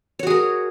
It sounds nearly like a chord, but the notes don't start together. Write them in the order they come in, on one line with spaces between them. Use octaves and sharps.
C#5 F#4 G#4 A#4